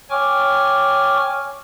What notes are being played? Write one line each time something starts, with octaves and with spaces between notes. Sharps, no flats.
C#5 G5 G#5 C#6 D6 F6